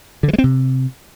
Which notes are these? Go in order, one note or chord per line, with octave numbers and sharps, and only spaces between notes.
D3
E3
G#3
C4
C3